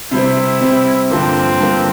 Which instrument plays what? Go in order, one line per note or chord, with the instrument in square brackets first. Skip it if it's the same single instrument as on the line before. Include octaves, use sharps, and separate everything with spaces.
[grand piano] C3 G3 C4 [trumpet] E4
[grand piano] C3 G3 C4
[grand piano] G2 D3 F3 A#3 [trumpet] C4
[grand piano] G2 D3 F3 A#3